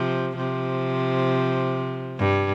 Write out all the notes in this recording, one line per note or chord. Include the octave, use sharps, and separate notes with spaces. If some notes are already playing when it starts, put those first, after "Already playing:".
Already playing: C3 F3
C3 F3
G2